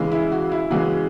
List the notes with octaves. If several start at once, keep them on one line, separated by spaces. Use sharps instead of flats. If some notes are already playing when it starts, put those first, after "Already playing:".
Already playing: C#3 E3 G#3
E4
F#4
E4
C#3 E3 G#3 F#4